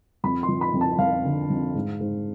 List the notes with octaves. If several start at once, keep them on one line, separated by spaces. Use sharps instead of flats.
F2 B5
C6
F3
B5
F2
A5
F2 F5
D3
F2
G#2
G#2